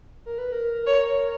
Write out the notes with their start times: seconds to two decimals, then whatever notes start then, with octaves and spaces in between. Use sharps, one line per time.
0.26 A#4
0.38 B4
0.52 A#4
0.87 C#5